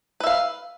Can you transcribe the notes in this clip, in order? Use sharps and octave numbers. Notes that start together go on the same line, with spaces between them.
B4 E5 F5